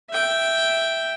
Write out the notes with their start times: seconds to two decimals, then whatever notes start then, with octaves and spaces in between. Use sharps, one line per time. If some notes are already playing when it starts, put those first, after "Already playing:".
0.10 E5 G5